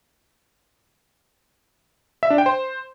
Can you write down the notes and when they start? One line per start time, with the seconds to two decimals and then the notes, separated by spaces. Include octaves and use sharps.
2.23 E5
2.30 D4
2.38 G5
2.46 C5